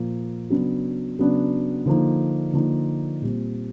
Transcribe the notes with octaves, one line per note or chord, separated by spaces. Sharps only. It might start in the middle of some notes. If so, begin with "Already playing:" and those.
Already playing: A#2 F3 A#3
C#3 F#3 B3 D4
C#3 F#3 B3 D4
D3 F3 A#3 D#4
D3 F3 A#3 D#4
A#2 G3 C4